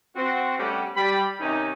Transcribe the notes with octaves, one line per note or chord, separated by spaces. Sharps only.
C4 F#4
G3 A3 B3 C#4 G4
G3 B5
C3 D#3 C#4 D#4